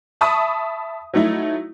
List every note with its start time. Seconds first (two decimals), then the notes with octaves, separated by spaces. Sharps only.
0.21 E5 A5 B5 C#6 D#6
1.14 F#3 A3 D#4 E4